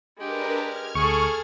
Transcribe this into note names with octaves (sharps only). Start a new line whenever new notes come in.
G#3 D4 G4 A#4 B4
F6 G#6
D2 G#4 A4 C#6